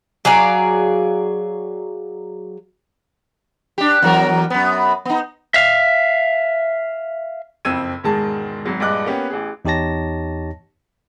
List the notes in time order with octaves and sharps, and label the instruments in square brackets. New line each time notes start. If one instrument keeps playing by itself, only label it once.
[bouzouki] F#3 G#4 D5 F5
[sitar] D4 G4
E2 F#3 A#4
F#2 B3
B3 D#4
[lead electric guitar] E5 F5
[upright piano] F#1 F2 C4 E6 G#6 D#7
E1 G#2 D#3 G#3 G#4 A5
G#1 F#3
A#1 G2 G#3 D#5 D6 F#6
A#3 B3 C#4 G4
A1 G#4
[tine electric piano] E2 D#4 G4 C#5 A5 A#6